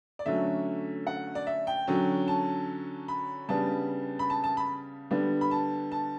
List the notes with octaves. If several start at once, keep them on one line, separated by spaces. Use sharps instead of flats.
D5
D3 F#3 A3 C#4 E5
F#5
D5
E5
G5
D3 F#3 C#4
A5
B5
C#3 G3 B3 D4 A5
B5
A5
A5
B5
D3 G3 B3 D4
B5
A5
A5